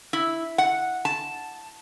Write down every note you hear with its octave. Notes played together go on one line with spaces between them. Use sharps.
E4
F#5
A5